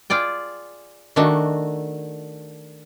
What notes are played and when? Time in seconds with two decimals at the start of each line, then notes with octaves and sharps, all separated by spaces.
0.10 F4 G#4 D5 G5
1.16 D#3 A3 D4 F#4